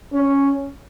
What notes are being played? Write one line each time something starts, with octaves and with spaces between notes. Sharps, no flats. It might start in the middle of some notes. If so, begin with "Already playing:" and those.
C#4